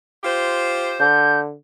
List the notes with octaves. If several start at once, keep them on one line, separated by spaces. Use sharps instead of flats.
F4 G4 C5
D3 G6